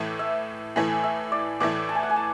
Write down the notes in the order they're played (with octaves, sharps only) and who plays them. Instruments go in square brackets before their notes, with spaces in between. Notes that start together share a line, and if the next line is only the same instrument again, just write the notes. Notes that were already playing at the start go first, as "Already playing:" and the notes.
Already playing: [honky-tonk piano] A2 E3 A3 E4
[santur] E5
[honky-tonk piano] A2 E3 A3 E4 [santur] G#5
[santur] E5
D5
[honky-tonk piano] A2 E3 A3 E4 [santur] D5
[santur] A5
G#5
F#5
G#5
A5